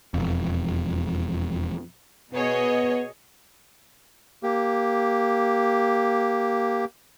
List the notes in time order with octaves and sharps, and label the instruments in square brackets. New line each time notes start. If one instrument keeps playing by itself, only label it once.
[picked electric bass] E1 F2
[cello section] B2 [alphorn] B3 [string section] G#4 C#5 D#5
[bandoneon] A#3 G4